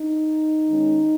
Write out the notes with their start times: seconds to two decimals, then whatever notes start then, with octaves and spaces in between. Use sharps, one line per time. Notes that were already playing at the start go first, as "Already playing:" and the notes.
Already playing: D#4
0.69 D#3 G#3 C#4